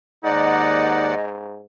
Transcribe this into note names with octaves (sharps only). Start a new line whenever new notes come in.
D#2 G#2 D#4 D5 D#5 F#5